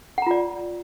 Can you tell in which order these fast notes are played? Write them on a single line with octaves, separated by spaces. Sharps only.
F#5 A#5 F4 D5